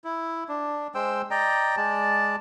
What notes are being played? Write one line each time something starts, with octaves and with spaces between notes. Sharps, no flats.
E4
D4
G#3 C5 G5 E6
D5 D#5 G5 A#5
G#3 D5 A5